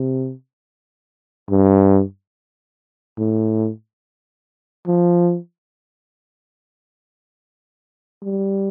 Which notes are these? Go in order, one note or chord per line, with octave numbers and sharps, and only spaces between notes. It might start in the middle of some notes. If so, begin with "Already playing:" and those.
Already playing: C3
G2
A2
F3
G3